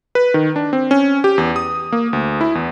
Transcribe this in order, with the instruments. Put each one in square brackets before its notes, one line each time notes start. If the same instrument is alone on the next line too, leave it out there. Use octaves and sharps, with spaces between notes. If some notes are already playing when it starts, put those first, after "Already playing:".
[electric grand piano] B4
D#3
D4
C4
C#4
G4
E2
D#6
A#3
D2
E4
E2